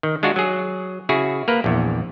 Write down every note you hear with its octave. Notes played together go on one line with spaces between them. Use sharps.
D#3
G#3 D4 F4 F#4
F#3 G#4
C#3 E4 F#4 G#4
A#3 A#4 B4
A#1 E2